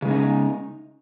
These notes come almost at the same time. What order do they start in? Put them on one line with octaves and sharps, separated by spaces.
C#3 G#3 C#4 D#4